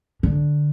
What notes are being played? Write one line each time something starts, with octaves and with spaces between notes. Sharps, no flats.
D3